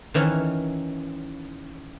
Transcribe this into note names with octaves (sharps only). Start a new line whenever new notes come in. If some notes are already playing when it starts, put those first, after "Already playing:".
D#3 E3 C#4